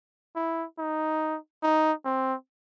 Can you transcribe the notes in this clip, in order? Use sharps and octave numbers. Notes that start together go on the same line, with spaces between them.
E4
D#4
D#4
C4